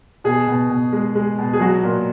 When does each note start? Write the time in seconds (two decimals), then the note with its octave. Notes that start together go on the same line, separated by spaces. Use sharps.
0.24 B2 G#4
0.47 B2
0.70 B2
0.93 G#3
1.15 G#3
1.38 B2
1.53 G#4
1.60 F#3 F#4
1.83 A#2